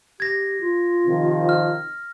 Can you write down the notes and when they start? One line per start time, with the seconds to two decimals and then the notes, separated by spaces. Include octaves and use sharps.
0.20 G4 G#6 A#6
0.61 F4
1.06 C3 D#3 F3
1.49 F6